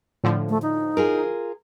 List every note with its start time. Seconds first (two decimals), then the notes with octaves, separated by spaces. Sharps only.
0.24 A2 D3 F3
0.49 A3
0.62 D#4
0.97 F4 G#4 A#4